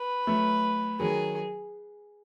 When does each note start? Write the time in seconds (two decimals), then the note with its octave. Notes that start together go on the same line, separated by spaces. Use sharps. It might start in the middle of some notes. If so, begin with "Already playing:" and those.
Already playing: B4
0.27 F#3 A3
0.99 D#3 F#3 G#4